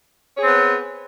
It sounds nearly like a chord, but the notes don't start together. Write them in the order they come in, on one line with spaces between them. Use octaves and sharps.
C#5 G#4 C4 B3